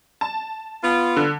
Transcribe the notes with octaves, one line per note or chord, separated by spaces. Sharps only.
A5
B3 F4
D3